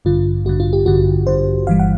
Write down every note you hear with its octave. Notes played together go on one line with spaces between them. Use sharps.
A1 G2 D3 F4
A1 G2 D3 F#4
F4
G4
A1 G2 D3 F#4
A1 G2 D3 C5
G1 G2 E3 G3 F5
F#5